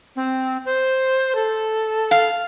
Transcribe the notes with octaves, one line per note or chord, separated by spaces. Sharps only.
C4
C5
A4
F5